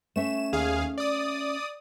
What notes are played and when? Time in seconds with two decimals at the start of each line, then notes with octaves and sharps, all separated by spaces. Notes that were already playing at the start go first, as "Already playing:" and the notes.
0.16 A3 C#4 E5 E7
0.53 D#2 G#4 F5
0.98 D5 D#6